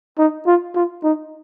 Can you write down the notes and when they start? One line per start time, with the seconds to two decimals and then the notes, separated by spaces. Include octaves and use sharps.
0.18 D#4
0.47 F4
0.75 F4
1.04 D#4